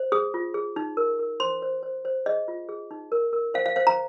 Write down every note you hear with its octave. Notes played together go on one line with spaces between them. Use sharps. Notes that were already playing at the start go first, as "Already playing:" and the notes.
Already playing: C5
G#4 D#6
F4
G#4
D#4
A#4
A#4
C5 C6
C5
C5
C5
G#4 D#5
F4
G#4
D#4
A#4
A#4
C5 F5
F5
C5 F5
A#5